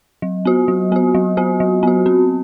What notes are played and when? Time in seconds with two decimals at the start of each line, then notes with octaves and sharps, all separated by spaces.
0.22 F#3
0.45 B3 F#4
0.68 F#3
0.92 B3 F#4
1.14 F#3
1.37 B3 F#4
1.60 F#3
1.83 B3 F#4
2.06 C4